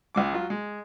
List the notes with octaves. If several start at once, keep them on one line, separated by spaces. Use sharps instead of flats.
C#2 G#3 D6
F#3 F4
G#3